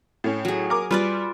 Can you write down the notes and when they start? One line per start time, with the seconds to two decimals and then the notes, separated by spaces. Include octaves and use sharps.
0.24 A2 C#4
0.45 F#3 G#4
0.70 A#4 D6
0.91 G3 F4 B4 D5